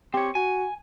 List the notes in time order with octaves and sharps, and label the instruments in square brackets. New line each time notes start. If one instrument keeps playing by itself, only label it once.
[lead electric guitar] C4 C#5 [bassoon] G4
[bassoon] F#4 [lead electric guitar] G#5